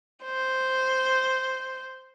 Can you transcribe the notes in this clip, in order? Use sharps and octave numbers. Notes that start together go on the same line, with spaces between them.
C5